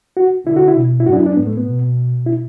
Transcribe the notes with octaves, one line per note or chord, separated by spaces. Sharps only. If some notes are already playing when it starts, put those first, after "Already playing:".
F#4
D3 E4
F#4
E4
B2
E4
F#2 F#4
D4
E4
D4
A2 B3
A3
B3
B2
E4